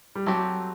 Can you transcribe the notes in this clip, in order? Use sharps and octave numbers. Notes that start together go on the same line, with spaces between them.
G3
F#3 A3 C4 G4